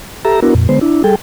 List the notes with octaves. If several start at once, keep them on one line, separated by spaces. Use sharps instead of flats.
G4 A4 E5 A#5
B3 D4 E4 F#4 A#4
F2 A#2
D3 G#3 B3 C5
D4 E4
G3 G#4 A4 G5